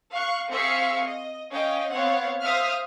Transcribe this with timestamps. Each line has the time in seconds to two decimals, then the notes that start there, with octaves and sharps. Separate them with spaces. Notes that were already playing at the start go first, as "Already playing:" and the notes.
0.12 F5 C#6 F#6
0.50 C4 G#4 E5 F5 C#6 C#7
1.06 D#5
1.50 C#4 D#5 F5 G5
1.92 B3 C4 C#5 F5 F#5
2.43 C5 E5 F5 D#6 F6